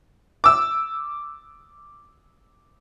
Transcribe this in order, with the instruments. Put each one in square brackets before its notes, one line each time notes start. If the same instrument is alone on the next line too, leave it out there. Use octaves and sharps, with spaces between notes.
[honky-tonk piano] D6 E6